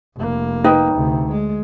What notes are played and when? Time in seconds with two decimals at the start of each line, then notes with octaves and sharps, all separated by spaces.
0.16 F1 A#3
0.64 D#4 B4 G5
0.94 D2 C3
1.31 G#3